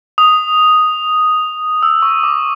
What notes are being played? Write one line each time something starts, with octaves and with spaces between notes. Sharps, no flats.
D#6
E6
C#6
D6